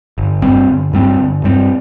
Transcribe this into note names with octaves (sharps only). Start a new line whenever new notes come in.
G1
G2 G3 C4
G1
G2 G3 C4
G1
G2 G3 C4